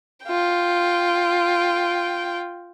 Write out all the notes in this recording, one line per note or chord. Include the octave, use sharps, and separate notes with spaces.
F4 G5